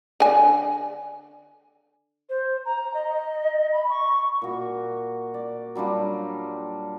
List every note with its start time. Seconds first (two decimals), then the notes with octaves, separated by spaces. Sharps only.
0.20 D3 G#5
2.29 C5
2.65 A#5
2.94 D#5
3.72 B5
3.89 C#6
4.42 A#2 F#4
5.34 D5
5.75 F#3 G3 D4 F4